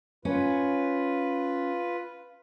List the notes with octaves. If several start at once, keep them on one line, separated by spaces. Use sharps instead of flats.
C#4 F4 B4